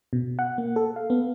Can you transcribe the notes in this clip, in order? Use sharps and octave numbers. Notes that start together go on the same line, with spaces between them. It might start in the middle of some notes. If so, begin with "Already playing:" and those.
B2
F#5
A#3
A4
F5
B3